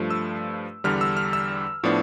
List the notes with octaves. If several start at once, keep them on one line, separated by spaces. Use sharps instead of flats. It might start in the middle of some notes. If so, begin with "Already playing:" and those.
Already playing: G2 F3 A3
E6
E2 D3 G3 D4 F6
E6
F6
E6
A2 F3 B3 D4